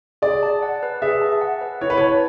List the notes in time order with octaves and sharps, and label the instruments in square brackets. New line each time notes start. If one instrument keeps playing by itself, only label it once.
[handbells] G#4 [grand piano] D5
[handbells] A5
F#5
B4
[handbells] G#4 [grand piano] E5
[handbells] A5
F#5
B4
[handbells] E4 [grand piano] C#5
[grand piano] B4
C#5
[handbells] A5